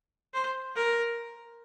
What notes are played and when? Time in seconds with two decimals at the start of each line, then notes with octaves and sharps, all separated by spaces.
0.34 C5
0.76 A#4